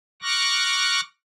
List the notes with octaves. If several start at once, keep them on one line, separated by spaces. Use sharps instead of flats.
C#6 D6 F6 F#6 A#6